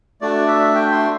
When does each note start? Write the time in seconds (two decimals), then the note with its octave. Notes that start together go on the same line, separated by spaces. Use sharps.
0.21 A3 D4 F#4 D5
0.47 E5
0.75 G5
0.91 C6